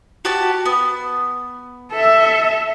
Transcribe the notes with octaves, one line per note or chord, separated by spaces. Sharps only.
F#4 G4 A5
B3
A4 E5